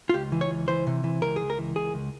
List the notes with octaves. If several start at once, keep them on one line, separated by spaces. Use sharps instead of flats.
F4
C#2 G4
E3
C#5
C#2
E3 C5
C3
E3
C#2 A#4
C#2 G#4
A#4
E3
C#2 G#4
C#2